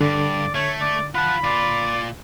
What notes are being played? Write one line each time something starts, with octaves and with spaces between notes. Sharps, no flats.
G2 D3 D5
A3 C#5
D5
F4 F#5 A5 B5
A#2 F4 D5